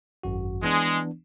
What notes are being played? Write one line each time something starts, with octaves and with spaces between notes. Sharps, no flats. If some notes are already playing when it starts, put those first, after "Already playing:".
G#1 F#2 F#4
E3 G#3 B3 D4